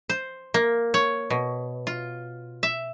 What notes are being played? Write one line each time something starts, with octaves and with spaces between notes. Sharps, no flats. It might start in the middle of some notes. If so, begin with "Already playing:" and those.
C5
A#3
C#5
B2
F4
E5